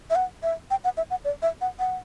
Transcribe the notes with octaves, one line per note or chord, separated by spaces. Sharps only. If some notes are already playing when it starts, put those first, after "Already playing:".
E5
F#5
E5
G5
F#5
E5
F#5
D5
E5
F#5
F#5